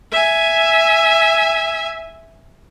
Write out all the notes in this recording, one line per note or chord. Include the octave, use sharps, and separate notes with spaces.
E5 G#5